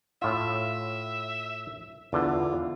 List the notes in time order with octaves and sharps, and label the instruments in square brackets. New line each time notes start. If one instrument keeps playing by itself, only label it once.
[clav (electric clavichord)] A2 F4 [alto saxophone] E5
[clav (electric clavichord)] E2 D3 [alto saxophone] F4